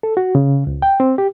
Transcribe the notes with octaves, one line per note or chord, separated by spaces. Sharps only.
A4
F#4
C#3
C#2
G5
C4
G4